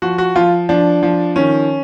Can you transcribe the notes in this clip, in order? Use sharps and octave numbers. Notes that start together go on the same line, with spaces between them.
F3 F#4
F#4
F3 F4
F3 D4
F3
D#3 C#4